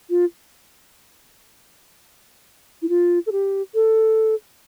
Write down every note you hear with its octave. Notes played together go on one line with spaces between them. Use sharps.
F4
E4
F4
A4
G4
A4